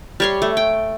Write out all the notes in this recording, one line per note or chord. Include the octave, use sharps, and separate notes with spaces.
G3 C#5 C6
A3
G5